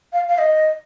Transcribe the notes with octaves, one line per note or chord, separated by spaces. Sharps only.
F5
F5
D#5